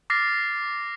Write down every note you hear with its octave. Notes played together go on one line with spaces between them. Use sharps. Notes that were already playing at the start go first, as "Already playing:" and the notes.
D6 F6 A6 A#6 C7